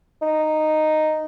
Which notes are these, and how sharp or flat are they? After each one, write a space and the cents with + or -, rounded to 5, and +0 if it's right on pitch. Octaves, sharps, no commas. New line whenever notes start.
D#4 -5